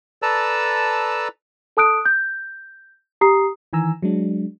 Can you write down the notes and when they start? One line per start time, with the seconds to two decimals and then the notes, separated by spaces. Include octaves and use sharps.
0.22 A4 B4 D5 A5 A#5 E6
1.77 A4 A5 D#6 F#6 D7
2.05 G6
3.21 G4 A#5 D#6 C7
3.73 D#3 E3 G#5 A#5 E6
4.02 F#3 G#3 D4